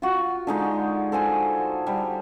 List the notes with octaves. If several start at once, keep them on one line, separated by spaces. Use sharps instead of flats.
F4 F#4
D3 G#3 D#4
A4 C5 G#5 C6
G3